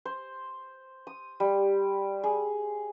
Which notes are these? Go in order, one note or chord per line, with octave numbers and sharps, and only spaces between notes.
C5
D#6
G3
G#4